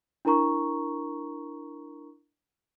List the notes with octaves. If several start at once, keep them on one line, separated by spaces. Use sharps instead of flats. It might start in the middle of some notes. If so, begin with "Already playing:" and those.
D4 E4 A#4 A#5 C#6